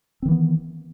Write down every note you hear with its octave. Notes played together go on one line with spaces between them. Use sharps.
D#3 E3 B3 C4